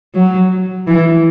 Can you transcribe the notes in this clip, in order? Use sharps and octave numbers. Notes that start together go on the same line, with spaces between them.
F#3
E3